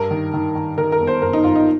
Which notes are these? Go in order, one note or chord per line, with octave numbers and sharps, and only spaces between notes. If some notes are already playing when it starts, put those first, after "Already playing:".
Already playing: G2 A#4
D#3
D#3
D#3
D#3 A#4
A#4
G1
C5
G1 A#4
D#4
G1 F4
D#4